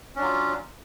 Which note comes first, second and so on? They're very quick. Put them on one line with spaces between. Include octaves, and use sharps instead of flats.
C#4 D4 F#3 F4